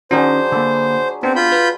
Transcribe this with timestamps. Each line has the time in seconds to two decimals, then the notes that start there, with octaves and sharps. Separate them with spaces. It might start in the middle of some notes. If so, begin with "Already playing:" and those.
0.11 D#3 F#3 C#4 D4 G#4 C5
0.52 D3 A#3 B4
1.23 B3 C4 D4
1.36 F4 B5 G6
1.52 B4